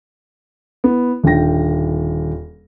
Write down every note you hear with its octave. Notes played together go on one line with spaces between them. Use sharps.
B3 E4
D#1 D3 D#3 G5 A#6